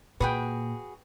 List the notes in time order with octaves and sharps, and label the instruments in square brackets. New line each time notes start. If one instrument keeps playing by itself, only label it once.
[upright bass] A#2 [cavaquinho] F#4 G#4 B5 [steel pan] B4 G5